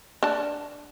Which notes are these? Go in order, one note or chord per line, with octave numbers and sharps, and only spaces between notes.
D4 A5